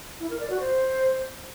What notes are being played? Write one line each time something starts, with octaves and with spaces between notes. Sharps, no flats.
E4
A#4
D5
F#4
C5